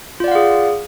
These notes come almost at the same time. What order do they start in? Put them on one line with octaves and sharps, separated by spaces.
F4 D5 F#5 F5 G#4